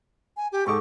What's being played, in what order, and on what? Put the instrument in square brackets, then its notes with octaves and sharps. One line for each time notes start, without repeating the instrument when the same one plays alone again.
[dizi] G#5
G4
[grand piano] G#2 A4 D6 [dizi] C#6